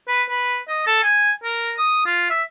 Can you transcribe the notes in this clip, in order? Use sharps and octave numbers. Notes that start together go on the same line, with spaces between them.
B4
B4
D#5
A4
G#5
A#4
D#6
F4
E5